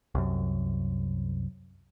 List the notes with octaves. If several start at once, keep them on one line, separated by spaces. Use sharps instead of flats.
C2 F#2